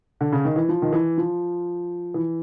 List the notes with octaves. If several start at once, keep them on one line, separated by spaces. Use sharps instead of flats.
D3
C#3
D#3
E3
F3
D#3
E3
F3
E3